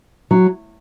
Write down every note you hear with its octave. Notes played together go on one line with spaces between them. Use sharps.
F#3